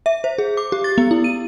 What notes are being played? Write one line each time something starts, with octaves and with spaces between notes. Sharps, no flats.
E5
C5
G#4
D6
G4
A6
B3
E4
D#7